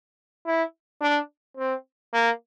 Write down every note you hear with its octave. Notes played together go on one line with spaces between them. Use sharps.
E4
D4
C4
A#3